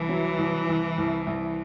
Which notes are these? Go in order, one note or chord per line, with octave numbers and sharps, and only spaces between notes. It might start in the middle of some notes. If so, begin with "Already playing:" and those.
Already playing: C2 E3
F#3
C2
C2
C2
C2